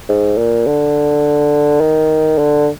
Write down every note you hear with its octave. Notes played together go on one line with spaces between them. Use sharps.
G#2
A#2
D3
D#3
D3